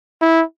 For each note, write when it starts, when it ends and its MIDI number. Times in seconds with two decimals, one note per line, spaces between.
0.21 0.43 64